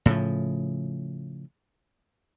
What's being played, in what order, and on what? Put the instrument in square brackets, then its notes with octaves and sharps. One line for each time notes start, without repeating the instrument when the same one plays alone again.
[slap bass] A2 C#3 F3